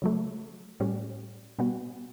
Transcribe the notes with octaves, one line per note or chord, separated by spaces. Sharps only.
C#3 F#3 A3
A2 G3 C#4
B2 G3 B3 F#4